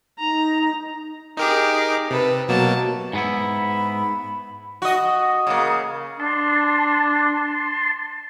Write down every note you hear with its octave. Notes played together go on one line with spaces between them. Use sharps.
D#4 A#5
D#4 G4 G#4 A#4 D6
C3 A4 B4
B2 F#3 A#3 A5
G#2 B3 E4 B5
F#4 D#5
C#3 A#3
D4 A5 C6